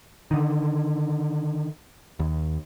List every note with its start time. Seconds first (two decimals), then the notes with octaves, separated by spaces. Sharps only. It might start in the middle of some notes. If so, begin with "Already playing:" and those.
0.31 D3 D#3
2.19 D#2